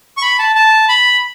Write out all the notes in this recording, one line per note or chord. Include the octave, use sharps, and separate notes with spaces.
C#6
B5
A5
A5
B5